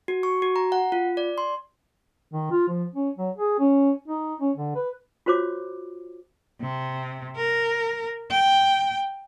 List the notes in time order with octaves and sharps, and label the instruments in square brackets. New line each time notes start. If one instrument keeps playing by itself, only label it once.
[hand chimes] F#4
C#6
F#4
A#5
F#5
F4
D5
C6
[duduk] D#3
F4
F3
C#4
F#3
G#4
C#4
D#4
C#4
D3
B4
[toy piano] F4 F#4 C5 C#5 D6
[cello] C3
A#4
G5